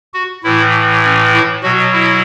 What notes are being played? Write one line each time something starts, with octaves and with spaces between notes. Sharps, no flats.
F#4
A2 E3 E4
C#4
E4
B2 F#3 F#4
E4